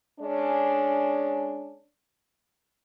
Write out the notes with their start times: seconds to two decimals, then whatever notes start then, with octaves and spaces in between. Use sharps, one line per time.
0.20 G#3 C#4 D4